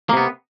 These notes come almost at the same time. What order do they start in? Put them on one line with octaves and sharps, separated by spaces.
A#3 C3 B3